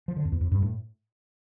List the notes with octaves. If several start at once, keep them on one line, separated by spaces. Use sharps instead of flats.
F3
D3
F2
E2
F2
G2
A2